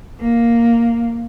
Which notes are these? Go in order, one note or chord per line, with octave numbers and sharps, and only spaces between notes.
A#3